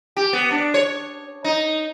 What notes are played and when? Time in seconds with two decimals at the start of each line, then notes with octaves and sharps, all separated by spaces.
0.17 G4
0.33 B3
0.51 D4
0.74 C#5
1.44 D#4